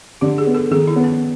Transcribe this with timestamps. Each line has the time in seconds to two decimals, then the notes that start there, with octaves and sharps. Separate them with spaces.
0.21 D3 G4
0.38 G#4
0.47 B3
0.54 A4
0.71 D#3 G#4
0.87 E4
0.96 B3
1.04 C#4